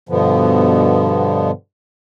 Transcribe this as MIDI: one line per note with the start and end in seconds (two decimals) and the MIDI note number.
0.09 1.51 43
0.09 1.51 47
0.09 1.51 50
0.09 1.51 53
0.09 1.51 59